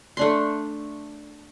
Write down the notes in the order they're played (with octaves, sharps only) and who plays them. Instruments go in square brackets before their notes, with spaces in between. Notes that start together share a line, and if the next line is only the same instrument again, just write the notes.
[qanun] A3 D4 C6